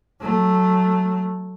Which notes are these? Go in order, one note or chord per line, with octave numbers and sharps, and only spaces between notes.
F#3 A3